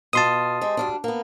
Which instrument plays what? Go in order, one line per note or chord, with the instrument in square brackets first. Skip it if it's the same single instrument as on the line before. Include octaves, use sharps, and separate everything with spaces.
[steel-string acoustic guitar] B2 F4 [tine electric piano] A5 C6 D#6
[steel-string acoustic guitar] G#3 C4 G4
D2 G3 D4
A#3 B3